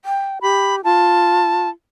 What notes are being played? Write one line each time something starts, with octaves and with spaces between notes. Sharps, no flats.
G5
G4 B5
F4 A5